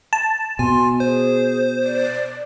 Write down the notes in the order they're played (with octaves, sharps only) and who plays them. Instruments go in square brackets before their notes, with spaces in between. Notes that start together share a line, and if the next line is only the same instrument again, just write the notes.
[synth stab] A5
[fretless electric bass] B2 [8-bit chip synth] G#5 [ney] C6
[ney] G#4 [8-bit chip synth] C5
[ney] D5